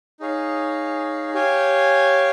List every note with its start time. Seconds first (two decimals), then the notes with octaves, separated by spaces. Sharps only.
0.20 D#4 G#4 C#5 F5
1.34 G4 C#5 F5 G#5